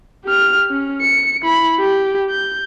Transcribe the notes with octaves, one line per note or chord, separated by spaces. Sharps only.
G4 F6
C#4
C#7
E4 B5
G4
G6